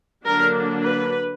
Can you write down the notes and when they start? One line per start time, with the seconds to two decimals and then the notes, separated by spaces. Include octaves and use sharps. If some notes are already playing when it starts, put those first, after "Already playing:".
0.25 D3 F#3 A#3 D4 A#4
0.82 B4